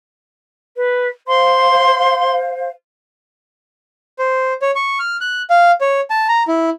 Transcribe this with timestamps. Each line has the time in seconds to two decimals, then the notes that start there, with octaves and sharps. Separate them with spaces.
0.77 B4
1.28 C5 F5 C6
4.19 C5
4.62 C#5
4.76 C#6
4.99 F6
5.21 F#6
5.50 F5
5.81 C#5
6.10 A5
6.29 A#5
6.48 E4